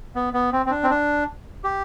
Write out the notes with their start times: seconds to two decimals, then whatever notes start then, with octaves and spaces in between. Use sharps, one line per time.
0.15 B3
0.33 B3
0.53 C4
0.66 C4
0.71 D4
0.83 C4
0.90 D4
1.64 G4